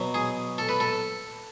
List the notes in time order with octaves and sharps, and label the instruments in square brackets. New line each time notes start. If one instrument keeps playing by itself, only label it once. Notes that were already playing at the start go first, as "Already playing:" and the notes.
Already playing: [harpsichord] B2 F#3
G#4
A4
B4
A4